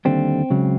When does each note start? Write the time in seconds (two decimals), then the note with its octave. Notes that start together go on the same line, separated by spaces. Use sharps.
0.05 D#2 D3 G3 C4
0.50 C#2 C#3 F#3